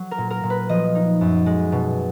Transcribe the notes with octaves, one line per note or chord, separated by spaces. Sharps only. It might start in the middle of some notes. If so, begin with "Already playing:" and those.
Already playing: F#3
A#4
A#2
A#4
A#2
B4
F3 D#5
D#4
F#2
G#3
B2